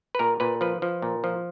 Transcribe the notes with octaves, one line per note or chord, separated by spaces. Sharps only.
B4
A#2 A#4
A#2 B4
F3 B4
F3
A#2
F3